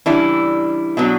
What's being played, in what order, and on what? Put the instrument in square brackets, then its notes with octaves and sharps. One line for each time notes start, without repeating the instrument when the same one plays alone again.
[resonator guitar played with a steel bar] C#3 E3 G3 D4 E4
B2 F#3 B3 D4